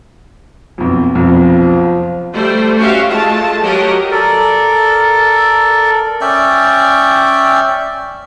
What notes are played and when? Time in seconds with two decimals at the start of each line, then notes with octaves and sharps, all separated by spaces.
0.78 B1 F2
1.15 F1 B1 F2 F3
2.35 G3 A3 C5
2.77 C#4 F#4 G4 E5 F5
3.08 G#3 A3 F4 A5
3.61 F#3 F#4 G4 A#4 D#5
4.11 A4 A#4 D5
6.21 C#4 D5 E5 G5